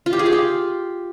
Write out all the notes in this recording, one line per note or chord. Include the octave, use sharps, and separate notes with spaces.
F4
G4
G#4
F5
G4